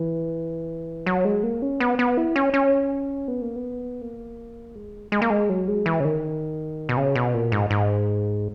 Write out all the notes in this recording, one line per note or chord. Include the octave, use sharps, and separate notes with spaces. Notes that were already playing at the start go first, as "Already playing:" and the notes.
Already playing: E3
F#3
G#3
A#3
C#4
B3
B3
E4
C#4
C#4
B3
A#3
B3
A#3
G#3
G#3
A#3
G#3
F#3
G#3
E3
C#3
D#3
B2
C#3
B2
A#2
G#2
G#2